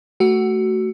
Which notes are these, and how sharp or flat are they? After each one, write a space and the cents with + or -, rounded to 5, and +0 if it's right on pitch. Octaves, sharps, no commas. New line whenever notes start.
A3 +0 F#4 +15